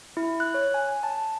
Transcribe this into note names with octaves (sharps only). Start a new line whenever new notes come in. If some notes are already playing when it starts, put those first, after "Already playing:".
E4
F#6
C#5
G#5
A5